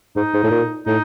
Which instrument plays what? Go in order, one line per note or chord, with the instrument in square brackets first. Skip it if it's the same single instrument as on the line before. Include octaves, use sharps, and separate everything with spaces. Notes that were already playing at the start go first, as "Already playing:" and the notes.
[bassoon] G#2 [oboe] D#4
[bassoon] G#2
A2
A#2
[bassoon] A2 [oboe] D#4